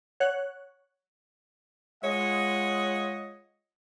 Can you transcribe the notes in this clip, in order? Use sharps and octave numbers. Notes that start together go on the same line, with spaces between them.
C#5 F#5 F#6
G#3 F4 C#5 D#5 F#5